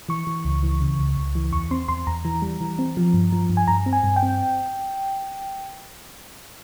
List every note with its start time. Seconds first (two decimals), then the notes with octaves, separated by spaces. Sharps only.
0.09 E3 C#6
0.27 E3
0.45 C#2
0.63 E3
0.81 C#3
0.99 C#2
1.17 C#2
1.35 E3
1.52 E2 C#6
1.71 C4 C6
1.88 E2 C6
2.07 E2 A#5
2.25 E3
2.42 G3
2.61 E3
2.79 C4
2.97 F3
3.14 G2
3.32 F3
3.50 G2
3.57 G#5
3.68 G2 A#5
3.86 C4
3.93 G#5
4.04 G2
4.16 G5
4.23 C4